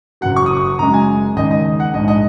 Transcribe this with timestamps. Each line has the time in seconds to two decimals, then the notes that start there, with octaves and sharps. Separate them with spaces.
0.21 F#1 F#2 F#3 F#5
0.36 C#6
0.46 D#6
0.57 C#6
0.79 F#1 F#2 C#3 G#3 A#5
0.94 G#5
1.36 D#2 C#3 G#3 D#5
1.51 D#5
1.80 F#5
1.94 A#1 G#2 G#3 D#5
2.08 D#5